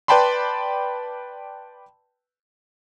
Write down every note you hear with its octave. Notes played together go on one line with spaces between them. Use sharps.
B4 D5 G5 A5 B5 C6